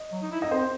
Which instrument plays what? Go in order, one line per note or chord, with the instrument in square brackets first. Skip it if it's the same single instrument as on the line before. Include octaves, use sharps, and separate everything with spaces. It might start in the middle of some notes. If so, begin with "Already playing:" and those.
Already playing: [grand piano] D#5
[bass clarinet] F#3
D#4
E4
[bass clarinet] D#4 [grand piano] D#5
[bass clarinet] C4 [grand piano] C5